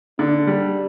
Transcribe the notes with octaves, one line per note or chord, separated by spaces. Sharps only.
D3 D4
G3